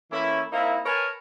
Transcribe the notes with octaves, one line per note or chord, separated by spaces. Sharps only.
E3 A3 A#3 C#4 E4
A#3 C4 D#4 E4
A#4 B4 C#5 G#5 A5